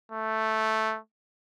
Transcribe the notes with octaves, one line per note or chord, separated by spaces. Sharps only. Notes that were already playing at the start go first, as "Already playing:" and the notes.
A3